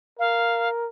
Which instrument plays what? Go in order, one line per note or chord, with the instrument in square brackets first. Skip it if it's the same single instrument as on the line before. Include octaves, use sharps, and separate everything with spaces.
[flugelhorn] A#4 [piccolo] F5